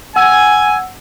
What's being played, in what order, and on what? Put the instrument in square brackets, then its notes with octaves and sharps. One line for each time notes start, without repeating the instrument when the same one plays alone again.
[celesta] F#5 E6 [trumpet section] G#5